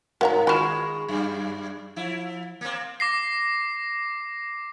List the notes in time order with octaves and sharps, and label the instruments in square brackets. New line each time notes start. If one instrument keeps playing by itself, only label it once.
[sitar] G2 [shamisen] F#4 C#5 A#5 [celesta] A#4 F5
[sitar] D#3 G#3 [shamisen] F4 F#4 [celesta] B5 C#6 E7
[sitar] F#2 G3
F3 E4
A#3 C4
[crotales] D6 A#6 C7